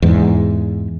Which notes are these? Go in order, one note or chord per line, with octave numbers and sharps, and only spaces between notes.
E2 G#2